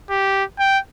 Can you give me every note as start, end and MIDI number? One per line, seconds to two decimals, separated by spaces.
0.10 0.44 67
0.59 0.79 79